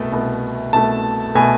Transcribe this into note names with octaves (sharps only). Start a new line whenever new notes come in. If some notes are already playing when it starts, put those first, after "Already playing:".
Already playing: C2 B2 A3
C2 B2 A3
C2 B2 A3 A5
B2 A3 G#5